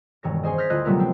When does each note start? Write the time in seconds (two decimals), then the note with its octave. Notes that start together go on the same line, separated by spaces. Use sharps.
0.23 E1 G2 D#3 C#5 A#6
0.43 C#4 G#4 C5 D#5
0.58 D#6 F6 G6 G#6 A#6 B6
0.70 D2 D3 E4 F4 D#5 F#6
0.85 C3 F#3 G3 A3 B3 A#4
0.99 F3 C4 D4